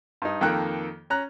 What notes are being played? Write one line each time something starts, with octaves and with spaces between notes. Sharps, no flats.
G2 D#4
F2 D#3 A#3 A4 G5 F#6
C#4 A#5 F#6